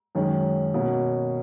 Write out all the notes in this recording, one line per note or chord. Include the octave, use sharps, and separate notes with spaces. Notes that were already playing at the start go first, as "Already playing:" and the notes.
F#2 D#3 G#3 C#4
B2 A#3 C#4